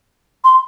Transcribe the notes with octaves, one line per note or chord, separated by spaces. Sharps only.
C6